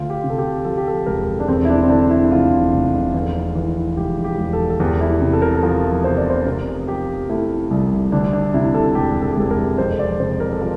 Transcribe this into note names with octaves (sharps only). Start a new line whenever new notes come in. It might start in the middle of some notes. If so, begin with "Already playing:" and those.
Already playing: D2 F4
G4
C3
A4
G4
F3 A4
G4
A4
E1 A#4
D4
E2 C4
E4
D4
C4
D3 D4
E4
E4
F1 F4
F1
E2
E3
E1 G4
G4
E1
A4
A4
E2 G4
E4
C3
A4
A#4
A4
F3 A#4
F1 C5
D5
C5
C3 A#4
F3 G4
A3 E4
C2
D2 D4
D4
C3 E4
A4
E1 G4
A4
G4
E1 A4
A#4
F2 C5
D5
C3 C5
A#4
A4
F3 A#4